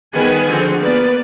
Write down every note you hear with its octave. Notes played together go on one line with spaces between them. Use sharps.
D#3 G3 B3 G#4 B4 G#5
D3 F3 C4 F#4 G#4
A#3 B3 B4 D5